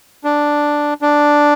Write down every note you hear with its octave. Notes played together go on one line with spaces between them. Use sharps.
D4
D4